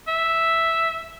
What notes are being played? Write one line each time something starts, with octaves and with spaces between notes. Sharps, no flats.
E5